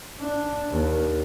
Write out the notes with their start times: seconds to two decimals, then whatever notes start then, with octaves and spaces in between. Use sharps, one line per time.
0.20 D4
0.70 D#2